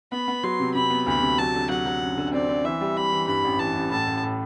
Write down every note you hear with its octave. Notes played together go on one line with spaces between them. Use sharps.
B3 B5
B3
F#3 C6
C3
C3 B5
B3
D2 B5
C3
F#3 A5
D3
F#3 F#5
F#3
F#2
D3
C4 D5
C4
E3 E5
G3
G3 B5
E3
G2 B5
A1
E3 A5
A1
A2 A5
A1
A2